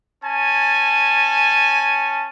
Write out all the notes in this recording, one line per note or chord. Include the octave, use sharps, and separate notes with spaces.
C#4 G#5 A5